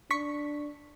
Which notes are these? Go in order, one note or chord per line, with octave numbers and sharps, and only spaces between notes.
D4 C#6 B6